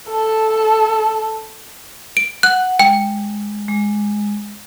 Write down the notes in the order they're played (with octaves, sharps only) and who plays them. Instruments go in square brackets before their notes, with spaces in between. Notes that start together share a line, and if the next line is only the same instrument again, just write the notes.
[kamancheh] A4 A5
[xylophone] D7
[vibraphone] F#5 [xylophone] F#6
[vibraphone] G#3 [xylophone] G5
[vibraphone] G#3